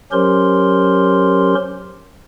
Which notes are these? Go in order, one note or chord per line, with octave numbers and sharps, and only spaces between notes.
F#3 C#4 G4 A#4 C5 C6